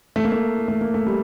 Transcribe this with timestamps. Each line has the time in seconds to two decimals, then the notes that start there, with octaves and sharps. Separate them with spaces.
0.16 A3
0.24 A#3
0.32 A3
0.68 A3
0.81 A#3
0.94 A3
1.07 G3